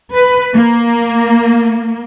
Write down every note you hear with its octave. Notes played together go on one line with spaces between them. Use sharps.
B4
A#3